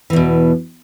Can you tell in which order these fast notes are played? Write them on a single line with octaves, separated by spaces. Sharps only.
E3 E2 B2